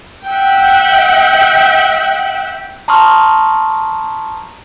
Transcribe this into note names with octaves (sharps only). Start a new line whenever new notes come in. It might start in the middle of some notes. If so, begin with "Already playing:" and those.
E5 F#5 G5
A5 A#5 C6 C#6 D#6 F6